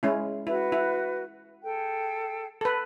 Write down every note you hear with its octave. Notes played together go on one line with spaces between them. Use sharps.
G#3 C#4 E4
E4 F#4 B4
E4
G#4 A4 G5
A4 B4